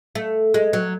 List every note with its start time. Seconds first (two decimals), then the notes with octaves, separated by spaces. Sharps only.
0.15 A3
0.54 G#3
0.73 F#3